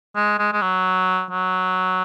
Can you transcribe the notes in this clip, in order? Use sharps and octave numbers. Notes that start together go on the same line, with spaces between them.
G#3
G#3
G#3
F#3
F#3